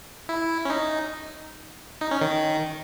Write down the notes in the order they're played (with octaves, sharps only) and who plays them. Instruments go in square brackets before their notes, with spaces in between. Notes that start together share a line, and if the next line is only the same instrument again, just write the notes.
[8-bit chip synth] E4
C#4
D#4
D#4
C#4
D#3